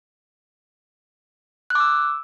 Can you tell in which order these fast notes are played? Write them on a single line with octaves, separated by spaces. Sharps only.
F#6 D6 E6